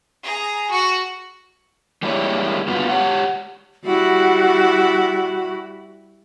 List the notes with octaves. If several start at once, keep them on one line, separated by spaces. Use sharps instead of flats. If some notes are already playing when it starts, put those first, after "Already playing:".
G#4 A#5
F#4 C#6
G3 G#3 A#3 E4 G4 C#5
G2 B3 F4 F#4
G4 C#5 F#5
G3 E4 F#4